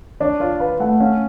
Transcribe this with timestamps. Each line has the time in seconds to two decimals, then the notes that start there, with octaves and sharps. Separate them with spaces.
0.20 D4 C#5
0.40 F4 C#5
0.60 B4 F5
0.80 A3 F#5
1.00 C#4 F5